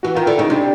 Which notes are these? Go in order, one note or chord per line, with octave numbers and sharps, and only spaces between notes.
E3 F#4
D#3 F4
D3 E4
C#3 D#4
C3 D4